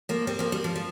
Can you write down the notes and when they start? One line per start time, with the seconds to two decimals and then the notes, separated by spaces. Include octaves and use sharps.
0.09 F3 A#3
0.27 G3 C4
0.39 F3 A#3
0.52 G3
0.64 F3
0.76 F3